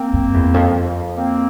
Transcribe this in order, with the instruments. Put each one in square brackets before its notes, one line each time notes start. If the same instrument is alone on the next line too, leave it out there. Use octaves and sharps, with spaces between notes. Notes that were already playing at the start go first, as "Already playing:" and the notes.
Already playing: [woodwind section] A#3 C4
[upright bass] F#2
E2
F2
[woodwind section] A#3 C4